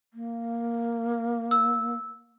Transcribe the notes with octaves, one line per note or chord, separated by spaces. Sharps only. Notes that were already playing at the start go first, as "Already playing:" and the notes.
A#3
E6